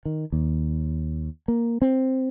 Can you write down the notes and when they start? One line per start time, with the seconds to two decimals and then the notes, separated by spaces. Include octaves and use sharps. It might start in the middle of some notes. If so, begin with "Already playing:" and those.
0.05 D#3
0.32 D#2
1.48 A#3
1.82 C4